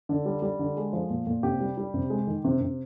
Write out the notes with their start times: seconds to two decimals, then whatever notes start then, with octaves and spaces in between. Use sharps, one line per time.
0.09 D3
0.25 G3
0.42 G3
0.59 D3
0.77 G#3
0.93 F3
1.10 A#2
1.27 A#2
1.43 C3 G4
1.60 G3
1.78 G3
1.94 C3
2.10 G#3
2.27 D#3
2.44 C3
2.61 C3